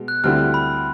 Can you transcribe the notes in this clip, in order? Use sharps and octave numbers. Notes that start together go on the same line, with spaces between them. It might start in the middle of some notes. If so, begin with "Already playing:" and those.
Already playing: B2 G#3
F#6
D2 D3 G3 C4 E4 F6
B5